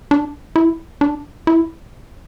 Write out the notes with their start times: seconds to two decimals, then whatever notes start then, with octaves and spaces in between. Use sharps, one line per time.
0.11 D4
0.56 E4
1.01 D4
1.47 E4